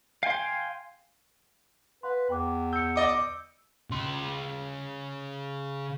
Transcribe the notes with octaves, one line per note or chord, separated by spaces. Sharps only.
F5 G5 G#5 C6
B4 F5 F#5 C6
E2 G5 D6
E6 G6 C#7
D5 D#5 D6
D6
C#3 C6